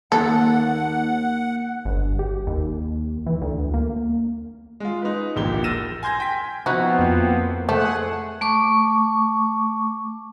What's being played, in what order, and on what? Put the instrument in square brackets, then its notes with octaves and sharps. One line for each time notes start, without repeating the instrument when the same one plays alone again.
[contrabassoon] D#2 [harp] A#3 [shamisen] A4 [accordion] F#5
[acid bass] G1
G4
D#2
E3
D2
A#3
[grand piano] G#3 F4
D#4 B4
E1 A#1 F3 A#3 G4 G7
E6 F6 A6 A#6 D#7 E7
G#5 C6 G6 G#6 A#6
G5 B6
[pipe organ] F3 B3 C4 [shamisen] D#4 C5 [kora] E4 F#4
[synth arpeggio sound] F2 A#3
[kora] A3 [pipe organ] G#4 F#5 [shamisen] A4 C5
[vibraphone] A3 C#6 D6